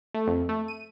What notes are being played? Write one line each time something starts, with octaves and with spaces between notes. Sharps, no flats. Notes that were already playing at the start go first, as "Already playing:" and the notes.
A3
F2
A3
D#7